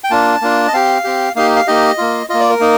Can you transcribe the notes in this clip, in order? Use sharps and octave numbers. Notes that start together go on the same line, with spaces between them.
G5
A#3 D4 F4 A5
A#3 D4 F4
D#5
C4 G4 F5
C4 G4
A#3 D#4 G4 F5
F5
A#3 D#4 G4 D#5
A#3 F4
A#3 F4 D#5
D5
A#4
A#3 D#4